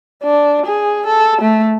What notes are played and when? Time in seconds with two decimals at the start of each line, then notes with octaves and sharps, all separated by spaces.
0.23 D4
0.66 G#4
1.06 A4
1.41 A3